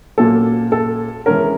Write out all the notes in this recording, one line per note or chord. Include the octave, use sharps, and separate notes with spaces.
A#2 F#3 A#3 C#4 A4
A4
E3 G#3 C#4 A#4